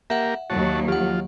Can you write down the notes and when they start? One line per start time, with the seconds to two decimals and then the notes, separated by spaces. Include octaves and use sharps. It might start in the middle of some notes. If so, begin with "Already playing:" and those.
0.10 A#3 G4 A#4 E5 F#5
0.50 D#2 F#3 F#4 C#5 A5
0.88 F3 F4 G4 F#5